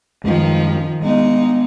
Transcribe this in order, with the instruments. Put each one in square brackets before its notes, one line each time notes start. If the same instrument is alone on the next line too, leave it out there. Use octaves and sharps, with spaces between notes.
[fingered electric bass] F#2 G3 G#3 [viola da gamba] D#3 F3
[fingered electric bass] G3 A#3 B3 [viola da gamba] G#3 D#4